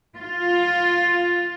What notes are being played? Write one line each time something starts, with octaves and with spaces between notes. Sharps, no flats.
F4